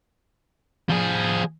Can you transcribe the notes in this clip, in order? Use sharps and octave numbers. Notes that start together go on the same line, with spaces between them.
F3 G#4